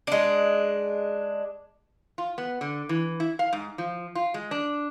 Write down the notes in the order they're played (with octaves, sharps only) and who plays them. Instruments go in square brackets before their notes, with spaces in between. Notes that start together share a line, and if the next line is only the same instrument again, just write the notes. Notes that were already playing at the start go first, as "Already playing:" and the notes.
[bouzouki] G#3 D4
[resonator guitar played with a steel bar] F4
B3
D3
E3
E4
F5
G#2
F3
F4
G#3
D4